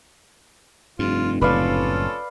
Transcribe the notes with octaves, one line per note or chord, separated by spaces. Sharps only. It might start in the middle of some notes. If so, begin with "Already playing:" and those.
F1 G2 F4
F#1 A2 C#4 F4 A4 B4 D5 F5